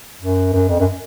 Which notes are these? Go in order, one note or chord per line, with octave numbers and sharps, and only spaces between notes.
F#2
F#2
F2
F#2